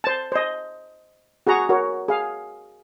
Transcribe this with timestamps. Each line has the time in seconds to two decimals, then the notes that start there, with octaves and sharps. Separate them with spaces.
0.04 C5 A5
0.32 C5 D#5
1.47 F#4 G#4 F#5 A#5 C#6
1.69 F#4 A#4 C#5
2.08 G#4 F5